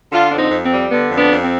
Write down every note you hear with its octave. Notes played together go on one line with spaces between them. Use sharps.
D3 D4 F4
F2 D4
C4 D#4
F2
C4
G3
D3 B3
F2
B3 D4
F2
C4